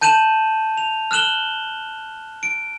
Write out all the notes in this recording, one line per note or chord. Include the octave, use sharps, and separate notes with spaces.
A5 G6 D#7 E7 F#7
F7
F6 F#6 E7 F#7 G7
D7